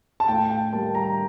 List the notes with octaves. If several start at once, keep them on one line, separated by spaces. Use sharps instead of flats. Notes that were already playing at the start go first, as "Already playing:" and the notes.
A5
A2 G5
G5
G3 A#3 A5
A#5